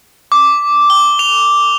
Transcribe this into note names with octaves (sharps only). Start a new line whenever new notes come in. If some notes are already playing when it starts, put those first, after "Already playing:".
D6
G7
F7